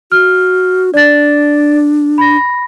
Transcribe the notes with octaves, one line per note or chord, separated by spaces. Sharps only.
F#4 F6
D4 D5 A6
B5 A#6